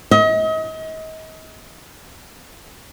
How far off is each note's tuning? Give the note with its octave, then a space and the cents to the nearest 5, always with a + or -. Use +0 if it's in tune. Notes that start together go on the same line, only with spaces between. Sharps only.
D#5 +35